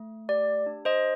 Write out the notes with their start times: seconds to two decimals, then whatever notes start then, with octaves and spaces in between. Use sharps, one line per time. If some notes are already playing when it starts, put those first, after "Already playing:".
Already playing: A3
0.29 G4 D5
0.66 D4
0.85 C5 D#5